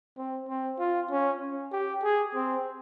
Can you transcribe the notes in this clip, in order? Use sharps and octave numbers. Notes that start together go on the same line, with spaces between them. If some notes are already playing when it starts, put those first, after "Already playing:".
C4
C4
F4
C#4
G4
G#4
C4